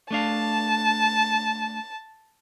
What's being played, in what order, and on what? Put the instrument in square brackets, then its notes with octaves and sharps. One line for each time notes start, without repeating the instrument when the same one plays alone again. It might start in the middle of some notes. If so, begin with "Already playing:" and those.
[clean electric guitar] A3 D4 F5 [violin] A5